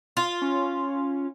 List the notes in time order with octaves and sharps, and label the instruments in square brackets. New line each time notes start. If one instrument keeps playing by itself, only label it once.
[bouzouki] F4
[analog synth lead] C#4